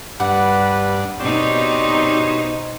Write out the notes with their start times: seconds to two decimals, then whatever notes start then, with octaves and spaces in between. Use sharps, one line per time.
0.20 G2 G3 D4 B4 F#5
1.20 B2 C4 D4 D#4 G4 C5 C#5